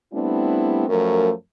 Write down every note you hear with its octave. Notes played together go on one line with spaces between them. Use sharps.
G3 A3 B3 C4 D4 E4
F#2 F3 A3 A#4